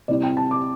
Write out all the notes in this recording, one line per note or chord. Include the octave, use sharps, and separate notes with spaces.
C3 G3 C4 E4 D5
G5
A5
D6